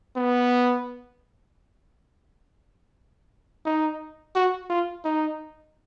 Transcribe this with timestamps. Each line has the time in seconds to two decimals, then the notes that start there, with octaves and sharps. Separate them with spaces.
0.16 B3
3.65 D#4
4.35 F#4
4.70 F4
5.05 D#4